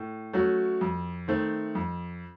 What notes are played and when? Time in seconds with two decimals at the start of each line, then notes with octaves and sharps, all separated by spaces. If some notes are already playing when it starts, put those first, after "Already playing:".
Already playing: A2
0.33 F#3 A3 C#4 F#4
0.81 F2
1.28 D#3 A3 C4
1.75 F2